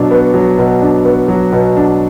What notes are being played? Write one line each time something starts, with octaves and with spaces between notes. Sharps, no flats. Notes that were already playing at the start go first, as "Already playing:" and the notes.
Already playing: B2 F#3 D4
B3
F#3
B2
D4
B3
F#3
B2
D4